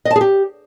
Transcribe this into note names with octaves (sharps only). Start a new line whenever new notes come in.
D#5
A5
G#4
G4